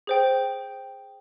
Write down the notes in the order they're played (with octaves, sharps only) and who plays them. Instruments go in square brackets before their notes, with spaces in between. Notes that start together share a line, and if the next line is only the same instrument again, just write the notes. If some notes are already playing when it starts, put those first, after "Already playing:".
[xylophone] G#4 C5 G5